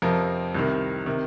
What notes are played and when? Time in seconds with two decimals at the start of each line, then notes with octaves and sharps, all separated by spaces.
0.02 F2 C3 F3 A#4
0.55 C2 C3 D#3
1.06 C3 D#3